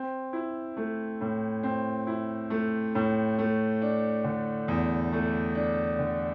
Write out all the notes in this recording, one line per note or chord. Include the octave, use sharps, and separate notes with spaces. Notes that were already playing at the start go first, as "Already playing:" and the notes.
Already playing: C4
E4
A3
A2
C4
E4
A3
A2
A3
D4
D3
E2
A3
D4
D3